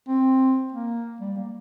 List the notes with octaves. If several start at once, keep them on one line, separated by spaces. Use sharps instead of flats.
C4
A#3
G3
A#3